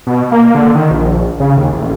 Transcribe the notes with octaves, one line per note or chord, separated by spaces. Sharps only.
B2
A#3
D3
D#3
A#1
C#3
D#2
A1